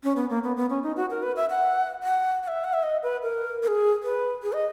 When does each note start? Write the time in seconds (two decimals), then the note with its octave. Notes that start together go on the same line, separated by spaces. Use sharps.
0.04 C#4
0.16 B3
0.30 A#3
0.44 B3
0.57 B3
0.70 C#4
0.83 D#4
0.97 F#4
1.10 A#4
1.23 B4
1.36 E5
1.50 F#5
2.03 F#5
2.43 F#5
2.48 E5
2.64 F#5
2.73 E5
2.83 D#5
3.03 B4
3.23 A#4
3.63 A#4
3.68 G#4
4.03 B4
4.43 G#4
4.53 D#5